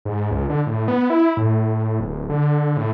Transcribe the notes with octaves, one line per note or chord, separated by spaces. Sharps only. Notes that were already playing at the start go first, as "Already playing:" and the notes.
G#2
C#2
D3
A2
B3
E4
A2
D1
D3
A2